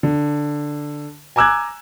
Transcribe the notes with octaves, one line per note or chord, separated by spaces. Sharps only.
D3
G#5 A#5 D6 E6 F#6 G#6